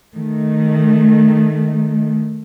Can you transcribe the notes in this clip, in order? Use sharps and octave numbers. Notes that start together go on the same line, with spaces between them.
D#3 A3